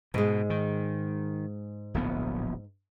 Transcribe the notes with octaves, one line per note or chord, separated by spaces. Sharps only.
G#2 B2 G#3
D#3
D1 A#1 B3